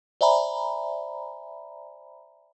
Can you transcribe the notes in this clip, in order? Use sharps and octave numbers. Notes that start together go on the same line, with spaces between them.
C5 D5 E5 G#5 A#5 B5